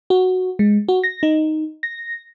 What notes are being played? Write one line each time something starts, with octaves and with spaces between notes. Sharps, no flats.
F#4
G#3
F#4
A#6
D#4
A#6